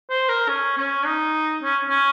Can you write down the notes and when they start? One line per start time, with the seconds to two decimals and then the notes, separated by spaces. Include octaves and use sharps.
0.10 C5
0.29 A#4
0.48 C#4
0.77 C#4
1.06 D#4
1.63 C#4
1.89 C#4